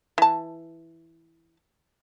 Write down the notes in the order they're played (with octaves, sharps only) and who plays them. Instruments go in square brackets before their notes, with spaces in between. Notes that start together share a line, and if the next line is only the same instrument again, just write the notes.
[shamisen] E3 A5